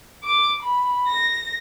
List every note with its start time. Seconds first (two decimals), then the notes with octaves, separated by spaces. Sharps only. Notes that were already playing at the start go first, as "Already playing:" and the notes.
0.24 D6
0.63 B5
1.08 A#6